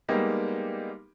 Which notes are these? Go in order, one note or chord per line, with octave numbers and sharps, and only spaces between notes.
G3 G#3 A#3 B3 D#4 G4